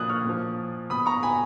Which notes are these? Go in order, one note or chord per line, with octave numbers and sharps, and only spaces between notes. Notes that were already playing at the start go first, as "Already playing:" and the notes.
Already playing: A#2 F3 D#6 F#6 G#6
C#6 F6
A#2 F3
B2 B5 D#6
A#5 C#6
G#5 B5